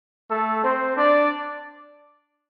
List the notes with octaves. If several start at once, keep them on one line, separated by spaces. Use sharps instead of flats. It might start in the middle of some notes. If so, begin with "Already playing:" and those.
A3 A4
C4 C5
D4 D5